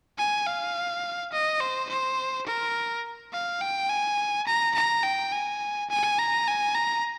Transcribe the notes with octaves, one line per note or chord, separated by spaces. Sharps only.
G#5
F5
D#5
C5
C5
A#4
F5
G5
G#5
A#5
A#5
G5
G#5
G#5
A#5
G#5
A#5